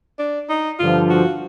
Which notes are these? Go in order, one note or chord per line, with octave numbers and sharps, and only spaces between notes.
D4
D#4
G2 D3 F3 F4
F#4